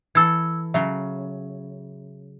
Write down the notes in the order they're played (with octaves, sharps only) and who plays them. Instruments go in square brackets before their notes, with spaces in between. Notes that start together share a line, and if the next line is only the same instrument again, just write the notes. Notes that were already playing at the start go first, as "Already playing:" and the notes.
[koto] E3 A4 [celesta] E6 G#6
[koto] C#3 F#3 [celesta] E5